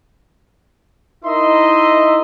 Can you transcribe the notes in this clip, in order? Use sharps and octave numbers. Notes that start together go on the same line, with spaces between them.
D#4 E4 A#4 D#5 E5 C6